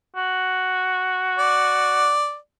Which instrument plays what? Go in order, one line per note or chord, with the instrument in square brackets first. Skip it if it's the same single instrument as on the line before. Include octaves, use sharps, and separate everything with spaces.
[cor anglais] F#4
[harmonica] D5